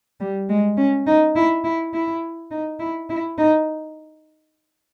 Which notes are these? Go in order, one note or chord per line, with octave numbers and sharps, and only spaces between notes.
G3
G#3
C#4
D#4
E4
E4
E4
D#4
E4
E4
D#4